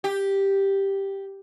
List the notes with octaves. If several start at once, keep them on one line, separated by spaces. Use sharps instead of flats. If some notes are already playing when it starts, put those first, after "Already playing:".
G4